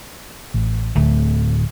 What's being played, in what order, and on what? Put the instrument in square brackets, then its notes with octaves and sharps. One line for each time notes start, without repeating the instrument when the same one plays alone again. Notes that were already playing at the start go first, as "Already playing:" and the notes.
[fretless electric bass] A1
[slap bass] D1 A3 [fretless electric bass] D2